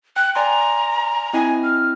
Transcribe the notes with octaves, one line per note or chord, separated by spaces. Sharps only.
G5 F#6
D5 G#5 A#5 C6
C4 E4 D#5 G#5
F6